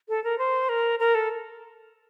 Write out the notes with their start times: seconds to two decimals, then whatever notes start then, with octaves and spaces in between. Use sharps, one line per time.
0.09 A4
0.24 A#4
0.38 C5
0.69 A#4
0.99 A#4
1.15 A4